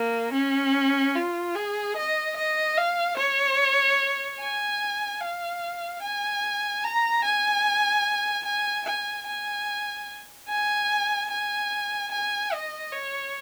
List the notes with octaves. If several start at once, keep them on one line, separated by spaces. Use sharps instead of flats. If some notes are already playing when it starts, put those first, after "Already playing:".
Already playing: A#3
C#4
F4
G#4
D#5
D#5
F5
C#5
G#5
F5
G#5
A#5
G#5
G#5
G#5
G#5
G#5
G#5
G#5
D#5
C#5